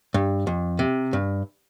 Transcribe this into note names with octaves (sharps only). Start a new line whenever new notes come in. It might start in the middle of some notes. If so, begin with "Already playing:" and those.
G2
F2
C3
G2